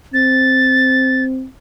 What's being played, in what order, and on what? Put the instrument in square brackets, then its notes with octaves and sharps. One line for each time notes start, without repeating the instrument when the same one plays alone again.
[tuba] C4 [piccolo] A6